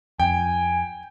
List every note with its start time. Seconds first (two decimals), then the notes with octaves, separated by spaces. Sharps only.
0.20 F2 G5 G#5